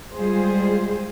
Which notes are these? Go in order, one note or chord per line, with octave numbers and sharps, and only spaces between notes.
G3 G#3 F4 G#4 C5